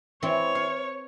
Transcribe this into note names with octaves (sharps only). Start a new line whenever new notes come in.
E3 C4 C#5
F5